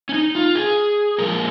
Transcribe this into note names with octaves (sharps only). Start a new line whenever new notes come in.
C#4
D#4
F4
G#4
A#2 F3 G#3 A#4